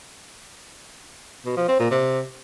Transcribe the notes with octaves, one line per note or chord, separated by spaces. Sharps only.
B2
F3
C4
A#2
C3